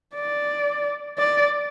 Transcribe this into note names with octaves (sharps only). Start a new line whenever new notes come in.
D5
D5